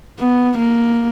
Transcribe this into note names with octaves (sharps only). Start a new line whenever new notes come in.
B3
A#3